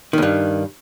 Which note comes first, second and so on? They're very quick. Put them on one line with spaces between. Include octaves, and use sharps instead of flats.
D#3 E2 G2